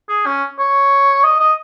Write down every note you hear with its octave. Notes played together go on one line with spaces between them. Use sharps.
G#4
C#4
C#5
D#5
D#5